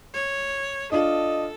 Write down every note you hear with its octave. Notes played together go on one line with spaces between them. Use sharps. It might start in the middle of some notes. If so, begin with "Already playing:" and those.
C#5
D4 F4 A4 D#5